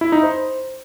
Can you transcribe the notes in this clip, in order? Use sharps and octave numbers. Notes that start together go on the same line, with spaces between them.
E4
D#4
C5